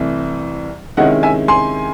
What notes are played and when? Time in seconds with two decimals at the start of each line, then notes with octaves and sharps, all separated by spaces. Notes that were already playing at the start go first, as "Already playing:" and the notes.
Already playing: C2 C3 E3 A3
0.97 C3 D#3 G#3 C#4 E4 D#5 F#5
1.23 E5 G#5
1.48 G#5 C6